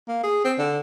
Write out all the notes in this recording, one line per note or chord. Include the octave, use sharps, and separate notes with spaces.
A#3
G#4
C4
D3